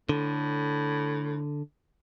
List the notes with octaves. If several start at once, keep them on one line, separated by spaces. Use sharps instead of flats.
A2 D3